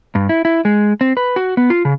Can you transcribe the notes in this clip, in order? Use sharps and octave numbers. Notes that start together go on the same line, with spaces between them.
G2
E4
E4
G#3
C4
B4
F#4
B3
F4
C#3